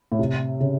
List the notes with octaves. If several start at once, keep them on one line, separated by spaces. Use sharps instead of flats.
A2
C3
C#3